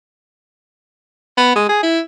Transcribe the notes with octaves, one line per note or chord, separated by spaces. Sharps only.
B3
G#3
G#4
E4